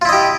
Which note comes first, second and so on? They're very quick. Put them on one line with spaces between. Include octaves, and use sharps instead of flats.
F4 E4 D#5 G4